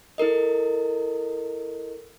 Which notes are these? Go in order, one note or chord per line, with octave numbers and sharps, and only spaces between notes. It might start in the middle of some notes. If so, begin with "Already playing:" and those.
E4 A4 A#4 D#5